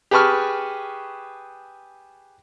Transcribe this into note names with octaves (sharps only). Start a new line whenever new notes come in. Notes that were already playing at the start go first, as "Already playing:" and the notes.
G4 G#4 B4 A5 C#6 F6